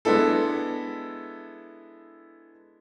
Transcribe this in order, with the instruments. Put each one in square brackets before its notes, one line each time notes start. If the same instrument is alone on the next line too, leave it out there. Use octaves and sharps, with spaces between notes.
[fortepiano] G#3 B3 D4 E4 A4